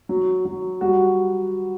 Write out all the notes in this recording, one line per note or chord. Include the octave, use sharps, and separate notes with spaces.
F#3
F#3
G3 F#4